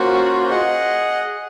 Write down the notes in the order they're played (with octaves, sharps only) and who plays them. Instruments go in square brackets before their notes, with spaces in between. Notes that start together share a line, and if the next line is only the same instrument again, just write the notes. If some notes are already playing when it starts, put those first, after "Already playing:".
Already playing: [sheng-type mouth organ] A#3 C#4 F4 C5 [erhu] F#4
[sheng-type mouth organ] G#4 D#5 F#5